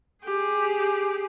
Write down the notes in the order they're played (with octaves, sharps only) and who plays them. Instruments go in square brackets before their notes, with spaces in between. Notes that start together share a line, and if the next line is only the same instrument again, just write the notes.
[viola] G4 G#4